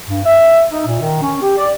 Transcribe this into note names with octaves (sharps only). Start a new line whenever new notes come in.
G2
E5
D#4
A#2
D#3
C#4
G4
D5